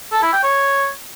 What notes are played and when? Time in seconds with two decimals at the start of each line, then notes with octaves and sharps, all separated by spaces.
0.12 A4
0.22 E4
0.33 G5
0.43 C#5